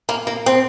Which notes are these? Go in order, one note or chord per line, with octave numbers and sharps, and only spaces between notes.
A#3
A#3
C4